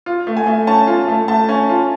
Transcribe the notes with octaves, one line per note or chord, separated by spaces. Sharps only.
F4
A3
G#5
A3
C#4 A5
F4
A3
A3 A5
C#4
F4